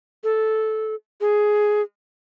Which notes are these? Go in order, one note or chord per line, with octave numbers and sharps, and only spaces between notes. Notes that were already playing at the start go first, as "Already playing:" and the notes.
A4
G#4